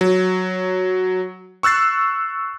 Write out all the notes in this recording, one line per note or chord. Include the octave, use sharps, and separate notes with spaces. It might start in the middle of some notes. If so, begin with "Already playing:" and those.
F#3
C#6 E6 F#6 A6 C7